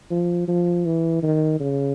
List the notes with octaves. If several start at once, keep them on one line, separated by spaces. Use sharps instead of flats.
F3
F3
E3
D#3
C#3